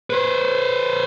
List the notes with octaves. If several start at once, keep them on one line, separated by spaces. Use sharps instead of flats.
B4 C5